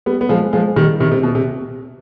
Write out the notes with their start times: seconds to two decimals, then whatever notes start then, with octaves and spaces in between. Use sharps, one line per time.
0.06 G3 B3
0.21 B3
0.29 F3 G#3
0.53 F3 G#3
0.76 D#3 G3
1.00 C3 D#3
1.12 C3
1.23 B2
1.35 C3